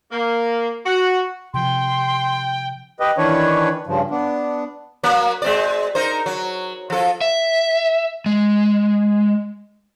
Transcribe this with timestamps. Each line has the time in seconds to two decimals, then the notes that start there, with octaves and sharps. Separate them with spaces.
0.12 A#3
0.86 F#4
1.54 C3 F3 G5 C6
3.00 G4 B4 D#5
3.18 D#3 E3 D4 B4 C#5
3.87 G2 C#3 F3
4.11 B3 D4
5.03 F#3 A#3
5.42 G#3 C4 D5
5.95 D#4 A#4 C5
6.26 F#3
6.90 F3 A4
7.21 E5
8.26 G#3